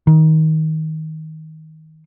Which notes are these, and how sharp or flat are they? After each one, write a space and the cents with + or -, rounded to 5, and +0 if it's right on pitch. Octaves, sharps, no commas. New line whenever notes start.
D#3 +20